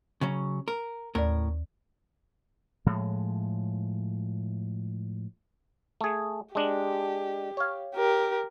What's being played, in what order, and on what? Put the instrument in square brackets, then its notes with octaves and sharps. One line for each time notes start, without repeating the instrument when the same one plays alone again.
[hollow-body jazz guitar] C#3 F#3 C#4
A#4
[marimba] D#2 D5 [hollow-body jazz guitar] A2 A#4
[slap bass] A2 F3 G#3
[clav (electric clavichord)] A3 G#4
[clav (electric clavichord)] G#3 D4 [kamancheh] G4
[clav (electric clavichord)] C#5 F5
[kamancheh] G4 A#4